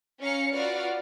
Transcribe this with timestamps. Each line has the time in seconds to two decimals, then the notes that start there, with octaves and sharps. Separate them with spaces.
0.20 C#4 C#5 F5 A#5 C7 C#7
0.52 F4 F#4 B4 D5 F5